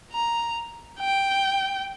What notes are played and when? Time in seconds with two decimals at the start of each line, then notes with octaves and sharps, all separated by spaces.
0.12 A#5
1.00 G5